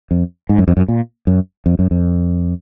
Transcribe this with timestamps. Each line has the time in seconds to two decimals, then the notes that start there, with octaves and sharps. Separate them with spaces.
0.11 F2
0.49 G#2
0.58 F#2
0.68 F2
0.77 F#2
0.88 A#2
1.27 F#2
1.66 F2
1.79 F#2
1.91 F2